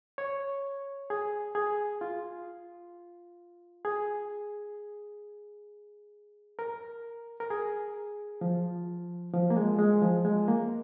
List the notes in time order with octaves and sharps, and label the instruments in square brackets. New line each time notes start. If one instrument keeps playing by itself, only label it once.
[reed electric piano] C#5
G#4
G#4
F4
G#4
A#4
A#4
G#4
F3
F3
A#3
G#3
G#3
F3
G#3
A#3